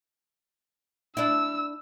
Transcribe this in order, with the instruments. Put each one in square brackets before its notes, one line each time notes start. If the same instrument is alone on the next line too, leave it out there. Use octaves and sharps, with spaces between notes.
[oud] D4 E4 [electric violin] E6